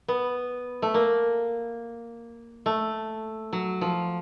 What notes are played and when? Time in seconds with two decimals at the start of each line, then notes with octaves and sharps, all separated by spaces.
0.08 B3
0.82 A3
0.94 A#3
2.66 A3
3.53 F#3
3.81 F3